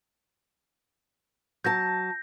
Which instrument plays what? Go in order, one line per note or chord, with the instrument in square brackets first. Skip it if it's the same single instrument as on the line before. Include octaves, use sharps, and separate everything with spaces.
[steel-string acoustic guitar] F#3 A5 [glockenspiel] G6 A#6